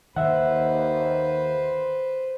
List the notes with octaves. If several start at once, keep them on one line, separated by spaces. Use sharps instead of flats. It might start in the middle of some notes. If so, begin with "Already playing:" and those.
D#2 D#3 B4 C5 E5 F#5